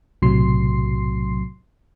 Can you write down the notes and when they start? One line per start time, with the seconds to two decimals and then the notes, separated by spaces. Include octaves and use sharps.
0.22 B1 A2 C3 F#3 C6 C7